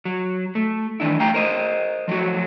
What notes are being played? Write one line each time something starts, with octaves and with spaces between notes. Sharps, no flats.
F#3
A3
D#3 E3 D4 E4
A3 F5 G5 A#5
A#4 C5 D#5
F3 F#3 A3 F#4